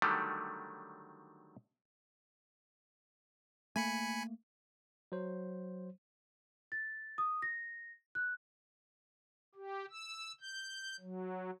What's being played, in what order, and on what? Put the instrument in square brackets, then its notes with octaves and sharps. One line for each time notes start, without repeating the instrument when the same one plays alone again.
[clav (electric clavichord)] D3 D#3 F#3 G3 A3
[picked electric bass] A3 A#3 [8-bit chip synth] G#5 B5 C#7
[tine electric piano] F#3 C5
[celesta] A6
D#6
A#6
F#6
[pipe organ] G4
E6
G6
F#3